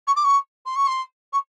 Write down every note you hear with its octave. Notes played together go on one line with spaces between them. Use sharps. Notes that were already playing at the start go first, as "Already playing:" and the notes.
C#6
D6
C#6
C6
C#6
C6
C#6